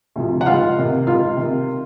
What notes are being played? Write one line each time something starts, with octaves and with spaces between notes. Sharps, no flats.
D2 C3 F3
F#5
C#2 F4 F5
C3 D#3
C#2 F4 F5
C3 D#3